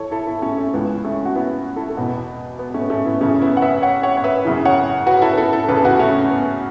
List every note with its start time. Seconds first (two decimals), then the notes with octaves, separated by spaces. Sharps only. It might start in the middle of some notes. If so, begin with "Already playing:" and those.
Already playing: E3 A4 C#5
0.11 E4 A4
0.27 E4 A4
0.42 A3 C#4
0.58 A3
0.74 C#2 C#3 E3 B3
1.04 A3 C#4
1.25 F#4
1.35 B3 E4
1.76 E4 A4
1.89 A4
1.97 E2 B2 F#4 B4
2.59 B3
2.70 B3
2.74 A3 C#4
2.90 A3 C#4
3.05 B3 E4
3.21 F#2 C#3 E3 A3 C#4
3.42 B3 E4
3.57 F#5
3.62 B4 E5
3.82 C#5 F#5
4.03 C#5 F#5
4.17 C#5
4.24 B4 E5
4.45 F#2 C#3 E3
4.65 C#5 F#5
5.06 F#4 B4
5.22 E4 A4
5.33 B4
5.38 E4 A4
5.53 E4 A4
5.68 E2 C#3 E3 B4
5.76 A4
5.84 F#4 B4
5.99 A3 C#4
6.30 B3